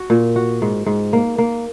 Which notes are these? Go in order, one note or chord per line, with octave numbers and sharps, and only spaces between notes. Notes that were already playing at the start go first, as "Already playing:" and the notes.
Already playing: F#4
A#2
F#4
G#2
G#2
A#3
A#3